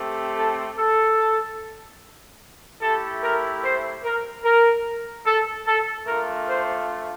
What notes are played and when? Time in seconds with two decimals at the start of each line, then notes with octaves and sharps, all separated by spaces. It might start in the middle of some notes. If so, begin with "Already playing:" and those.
Already playing: A3 C4 G4
0.37 A4
0.78 A4
2.81 A3 E4 G4 A4
3.23 A#4
3.63 C5
4.04 A#4
4.45 A#4
5.26 A4
5.67 A4
6.07 A3 D4 F4 A#4
6.48 C5